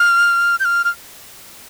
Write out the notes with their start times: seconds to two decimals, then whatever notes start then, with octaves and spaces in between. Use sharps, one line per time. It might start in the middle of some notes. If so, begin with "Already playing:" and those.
Already playing: F6
0.60 G6
0.65 F6
0.84 F6